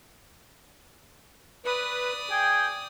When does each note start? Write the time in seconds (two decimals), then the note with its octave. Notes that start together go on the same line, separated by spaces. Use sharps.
1.65 B4 D5 D#6
2.31 G#4 G5